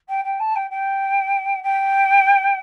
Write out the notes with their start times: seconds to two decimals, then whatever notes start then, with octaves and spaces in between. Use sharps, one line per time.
0.08 G5
0.24 G5
0.39 A5
0.55 G5
0.70 G5
1.63 G5